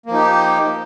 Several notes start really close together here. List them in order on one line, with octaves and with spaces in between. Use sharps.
A#3 F3 D#4 G4